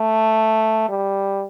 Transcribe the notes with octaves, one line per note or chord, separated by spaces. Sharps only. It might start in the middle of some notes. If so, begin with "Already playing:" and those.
Already playing: A3
G3